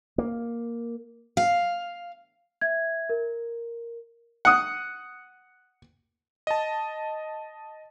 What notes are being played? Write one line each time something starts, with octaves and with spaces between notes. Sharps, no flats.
A#3
F5
E5 G#6
A#4
F#5 D#6
D#5 A5